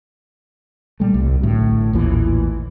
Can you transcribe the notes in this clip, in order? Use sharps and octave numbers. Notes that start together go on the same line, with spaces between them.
A#2 G3 A3
C2
A1 A2 D3 F#3
A1 D#2 A#2 E3